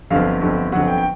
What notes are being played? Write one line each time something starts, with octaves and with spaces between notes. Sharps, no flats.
G1 F2 D3 F#3 F5
G1 F2 D3 F#3
G1 F2 D3 F#3 F#5
G5
G5